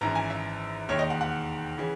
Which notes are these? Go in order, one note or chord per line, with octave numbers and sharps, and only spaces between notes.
G#1 F#2 E3 A#5
G#5
E5
E1 D#2 D#3 C#5
D#5
F#5
F#5
C#3 E3